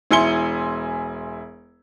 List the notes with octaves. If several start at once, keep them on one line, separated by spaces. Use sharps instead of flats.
E1 E4 G#5 C6 C#7 G7